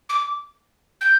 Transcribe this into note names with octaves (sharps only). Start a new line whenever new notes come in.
D6
G6